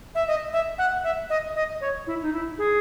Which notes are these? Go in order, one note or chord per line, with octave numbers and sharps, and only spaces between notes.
E5
D#5
E5
F#5
E5
D#5
D#5
C#5
E4
D#4
E4
G#4